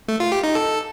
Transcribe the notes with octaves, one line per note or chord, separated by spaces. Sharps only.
A3
F4
G4
D#4
A4